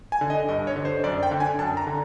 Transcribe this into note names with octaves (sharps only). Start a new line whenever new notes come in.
G#5
D3
D#5
G2 D#5
C#5
D3
C5
F#2 D5
G5
D3
G#5
F#2 A5
A#5
D3